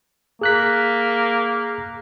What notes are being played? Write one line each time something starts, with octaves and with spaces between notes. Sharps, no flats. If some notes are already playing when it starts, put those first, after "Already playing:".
A#3 G#4 F#6 B6